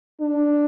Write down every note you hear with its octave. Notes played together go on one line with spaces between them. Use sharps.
D4